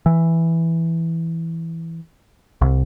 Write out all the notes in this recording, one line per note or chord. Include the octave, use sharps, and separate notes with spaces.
E3
C2